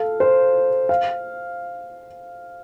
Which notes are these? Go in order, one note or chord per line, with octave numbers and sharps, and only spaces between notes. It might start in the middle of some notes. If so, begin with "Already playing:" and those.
Already playing: A4 F5
C5
F5